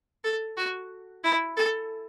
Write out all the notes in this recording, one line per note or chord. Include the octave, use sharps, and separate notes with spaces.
A4
F#4
E4
A4